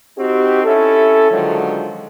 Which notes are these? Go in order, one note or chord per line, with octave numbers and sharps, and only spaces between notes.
C4 D#4 F#4 G4
C#4 E4 A4
D3 D#3 F3 F#3 G#3